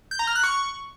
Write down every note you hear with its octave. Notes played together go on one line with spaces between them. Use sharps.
G6
A#5
F6
F#6
C#6